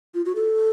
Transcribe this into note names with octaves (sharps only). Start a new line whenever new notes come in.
F4
F#4
A4